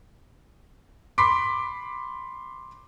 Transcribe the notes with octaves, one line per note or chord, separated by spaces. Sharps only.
B5 C6 D6 B6